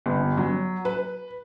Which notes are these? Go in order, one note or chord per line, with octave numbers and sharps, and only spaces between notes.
G1
F#3
B4